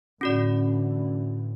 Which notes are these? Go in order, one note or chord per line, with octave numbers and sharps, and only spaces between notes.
A2 D3 E3 C#4 F#4 D5